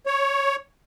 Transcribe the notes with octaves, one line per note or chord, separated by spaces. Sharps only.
C#5